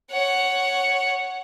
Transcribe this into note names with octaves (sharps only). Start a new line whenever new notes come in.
C#5 F#5